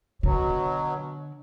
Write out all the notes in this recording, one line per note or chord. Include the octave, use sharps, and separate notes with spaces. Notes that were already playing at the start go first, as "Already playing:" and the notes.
B2 D3 F#3